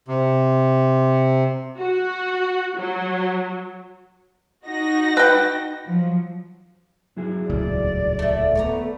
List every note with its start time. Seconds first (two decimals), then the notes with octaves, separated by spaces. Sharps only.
0.08 C3
1.77 F#4
2.76 F#3
4.65 D#4 F#4 A#6
5.17 B4 G5
5.85 F3 F#3
7.17 F#3 E4 G#4
7.50 D#1 C#2 A2 D5
8.19 A3 E5
8.55 A3 B3 C#5 D5 A#5